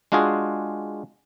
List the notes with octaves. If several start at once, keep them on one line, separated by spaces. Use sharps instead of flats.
G#3 D4 F4 F#4 G#4